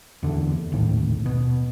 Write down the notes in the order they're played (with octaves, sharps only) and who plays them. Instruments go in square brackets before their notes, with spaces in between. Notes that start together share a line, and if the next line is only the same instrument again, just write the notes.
[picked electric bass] E2 D3
A#1 D#2 A2
B2